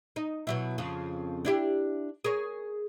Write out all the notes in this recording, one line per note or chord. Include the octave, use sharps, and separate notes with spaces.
D#4
B2 F#3 E4
F2 C#3 F3
D4 E4 G4
G#4 A#4 C#5